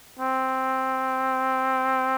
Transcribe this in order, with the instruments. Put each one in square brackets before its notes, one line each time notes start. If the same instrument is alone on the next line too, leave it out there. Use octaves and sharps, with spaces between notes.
[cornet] C4